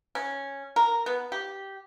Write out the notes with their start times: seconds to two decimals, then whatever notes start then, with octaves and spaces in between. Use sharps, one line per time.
0.15 C#4
0.76 A#4
1.06 B3
1.32 G4